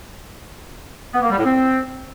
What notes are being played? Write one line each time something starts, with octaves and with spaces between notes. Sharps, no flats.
B3
A#3
G3
A2
C4